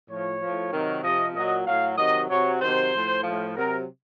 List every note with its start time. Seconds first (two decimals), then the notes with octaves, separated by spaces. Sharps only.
0.09 A2 F3 C#5
0.40 A2 F3
0.72 C3 D#3 F#3
1.04 C3 F3 D#5
1.35 A#2 F#3 D#5
1.67 A2 F#3 F5
1.98 C3 D#3 F#3 D#5
2.30 C3 F#3 C#5
2.61 C3 D#3 F#3 C5
2.93 A2 F3
3.24 A2 F3
3.55 C3 F#3 A#4